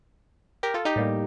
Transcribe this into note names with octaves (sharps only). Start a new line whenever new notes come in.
G4 A#4
F4 A4
D#4 G4
A2 G3 A#3